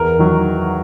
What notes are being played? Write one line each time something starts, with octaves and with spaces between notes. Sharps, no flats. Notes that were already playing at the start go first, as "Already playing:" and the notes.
Already playing: E2 A#4
D#3 F#3